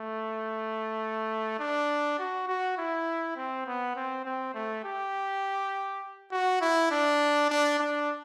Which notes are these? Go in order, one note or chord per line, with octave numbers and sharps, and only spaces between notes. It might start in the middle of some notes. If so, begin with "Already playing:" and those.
Already playing: A3
D4
F#4
F#4
E4
C4
B3
C4
C4
A3
G4
F#4
E4
D4
D4
D4